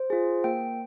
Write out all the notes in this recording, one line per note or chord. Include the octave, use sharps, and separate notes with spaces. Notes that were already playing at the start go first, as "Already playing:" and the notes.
Already playing: C5
F4 G#4
A#3 G5